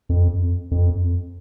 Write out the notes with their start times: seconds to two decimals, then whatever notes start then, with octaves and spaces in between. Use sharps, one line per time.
0.09 F2
0.71 F2